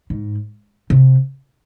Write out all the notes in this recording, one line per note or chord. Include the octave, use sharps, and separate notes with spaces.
G#2
C3